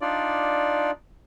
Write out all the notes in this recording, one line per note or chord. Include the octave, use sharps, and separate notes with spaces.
D4 D#4 F4 D5